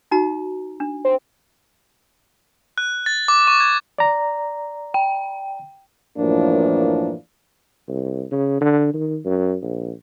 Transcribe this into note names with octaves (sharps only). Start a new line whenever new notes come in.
D#4 F#4 A#5
D4
C4
F#6
A6
D6
C#6
G#6
D5 A#5
G5
F#2 A2 E3 F3 A#3 D4
C2
C#3
D3
D#3
F#2
A#1